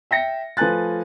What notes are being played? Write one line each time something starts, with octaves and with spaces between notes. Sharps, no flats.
E5 G5 A#6 C#7
F3 A3 B4 G#5 F#6 A6